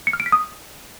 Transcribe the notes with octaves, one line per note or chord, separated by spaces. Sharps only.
C#7
F6
D7
B6
D#6